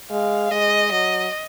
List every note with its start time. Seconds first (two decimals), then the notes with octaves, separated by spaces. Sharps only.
0.10 G#3 F5
0.51 G#3 D#5
0.91 F#3 D#5